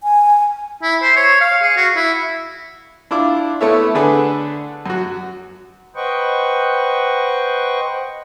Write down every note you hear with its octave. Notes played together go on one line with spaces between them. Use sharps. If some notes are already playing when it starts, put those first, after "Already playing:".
G#5
E4
C5
C#5
F5
G#4
F#4
E4
D4 E4 F4 D6
A3 B3 E4 A4 C#5 E5
D3 A3 D4 G#4 A4 B4
F#2 F#4
B4 C5 D#5 F#5 G5 C#6